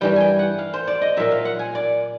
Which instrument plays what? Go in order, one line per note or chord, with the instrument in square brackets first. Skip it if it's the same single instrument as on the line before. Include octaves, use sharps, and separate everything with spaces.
[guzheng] G2 E3 G3 G5
G5 G#5
F#5
F5
C5
D5
D#5
A#2 F#3 E5
F5
F#5
G#5
D5